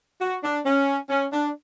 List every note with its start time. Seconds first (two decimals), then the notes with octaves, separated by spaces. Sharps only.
0.21 F#4
0.44 D4
0.66 C#4
1.10 C#4
1.33 D4